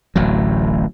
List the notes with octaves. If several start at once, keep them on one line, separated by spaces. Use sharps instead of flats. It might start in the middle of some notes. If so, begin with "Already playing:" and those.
D1 A1 A2 F#3